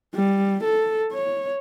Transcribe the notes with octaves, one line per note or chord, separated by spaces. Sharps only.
G3
A4
C#5